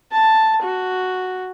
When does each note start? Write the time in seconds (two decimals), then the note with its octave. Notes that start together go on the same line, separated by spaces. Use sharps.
0.12 A5
0.63 F#4